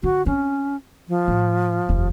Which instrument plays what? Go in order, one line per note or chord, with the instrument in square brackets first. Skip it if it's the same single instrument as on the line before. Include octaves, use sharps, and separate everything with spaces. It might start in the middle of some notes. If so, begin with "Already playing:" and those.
[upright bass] D3 [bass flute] F#4
[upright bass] C4 [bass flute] C#4
[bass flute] F3
[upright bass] A2
F1 D#2